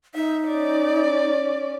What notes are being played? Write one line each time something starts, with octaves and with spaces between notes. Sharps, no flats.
D#4 E5
C#4 D5